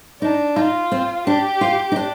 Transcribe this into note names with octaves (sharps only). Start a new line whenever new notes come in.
D4 D#4
D#4 F4
C4
D4 G4
F4
D#4
D4